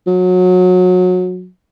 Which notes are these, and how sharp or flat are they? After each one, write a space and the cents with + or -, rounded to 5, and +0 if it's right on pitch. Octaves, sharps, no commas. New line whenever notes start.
F#3 -25